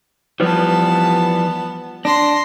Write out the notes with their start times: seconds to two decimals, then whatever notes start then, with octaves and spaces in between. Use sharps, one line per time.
0.40 E3 F3 G3 B3 A5
2.05 D4 C6 A#6